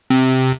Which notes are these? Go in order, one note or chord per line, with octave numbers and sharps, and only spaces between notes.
C3